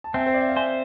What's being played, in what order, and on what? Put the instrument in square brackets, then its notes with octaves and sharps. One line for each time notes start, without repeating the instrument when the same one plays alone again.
[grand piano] A5
[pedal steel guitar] C4 [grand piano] E5 G#5
[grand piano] C5
D5
E5
F5
[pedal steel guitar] C5 [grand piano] E5 G#5